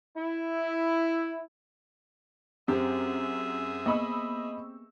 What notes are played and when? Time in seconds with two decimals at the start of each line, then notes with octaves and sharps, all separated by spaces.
0.16 E4
2.68 F#2 C4 G4 G#4 E5
3.86 A#3 B3 D#5 B5 C#6 E6